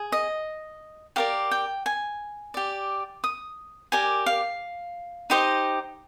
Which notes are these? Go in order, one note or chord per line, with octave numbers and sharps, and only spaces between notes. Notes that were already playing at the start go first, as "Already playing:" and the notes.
Already playing: G#4
D#5
G4 A#4 D5 F5
G5
G#5
G4 D5
D#6
G4 A#4 D5 G#5
F5
D#4 G4 C5 D#5